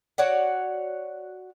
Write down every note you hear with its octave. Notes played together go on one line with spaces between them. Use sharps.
F#4 C#5 D5 F#5